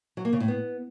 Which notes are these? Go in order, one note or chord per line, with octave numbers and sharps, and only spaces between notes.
F#3
A#3
C#3
A2
B3